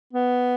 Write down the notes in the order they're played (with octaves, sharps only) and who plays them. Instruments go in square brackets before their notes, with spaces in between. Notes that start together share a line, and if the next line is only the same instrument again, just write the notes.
[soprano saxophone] B3